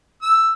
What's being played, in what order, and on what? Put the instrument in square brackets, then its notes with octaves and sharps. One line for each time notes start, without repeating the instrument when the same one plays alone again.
[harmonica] E6